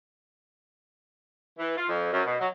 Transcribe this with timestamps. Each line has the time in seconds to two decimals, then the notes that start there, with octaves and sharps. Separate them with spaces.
1.58 E3
1.77 F4
1.89 F2
2.13 F#2
2.26 B2
2.39 F#3